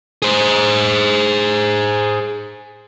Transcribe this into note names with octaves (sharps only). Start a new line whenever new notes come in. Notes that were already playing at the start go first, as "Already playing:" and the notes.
G#4 C5